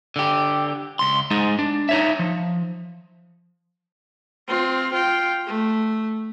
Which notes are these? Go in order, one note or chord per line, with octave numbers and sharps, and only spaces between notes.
D3 G4
C#2 C6
G#3 D#4 G#4
D4
D#4 C#5 E5
F3
C4 F4
F4 G5
A3